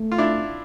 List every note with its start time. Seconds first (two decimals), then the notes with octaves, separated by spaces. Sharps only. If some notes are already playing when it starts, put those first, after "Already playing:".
Already playing: A3
0.12 F4
0.18 D4 E4